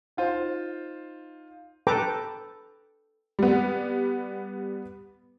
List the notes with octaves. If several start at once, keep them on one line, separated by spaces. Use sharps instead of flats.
D#4 F4 C5
A4 B4 G5 A5 A#5 D6
G3 B3